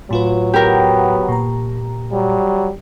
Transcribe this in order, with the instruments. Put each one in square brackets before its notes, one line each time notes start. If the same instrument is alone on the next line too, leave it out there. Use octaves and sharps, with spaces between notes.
[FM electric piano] A2 F4 B4 [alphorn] F#3
[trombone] B3 [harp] G4 A#4
[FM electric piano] A#2 A#5
[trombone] F#3 [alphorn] G3